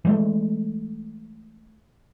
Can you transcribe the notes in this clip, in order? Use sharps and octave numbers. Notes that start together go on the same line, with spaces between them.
E3 G#3 A3